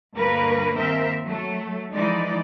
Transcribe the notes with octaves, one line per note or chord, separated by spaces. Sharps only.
D2 G2 A#3 A#4 B4
D#2 C4 A#4 E5
F#3 A3
E3 F3 G#3 D#4 D5